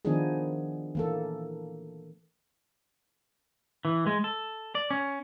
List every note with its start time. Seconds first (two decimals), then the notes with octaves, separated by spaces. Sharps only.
0.05 D#3 F3 B3 D4 D#4 G#4
0.95 E3 A#3 A4
3.85 E3
4.07 G#3
4.24 A4
4.75 D5
4.91 C#4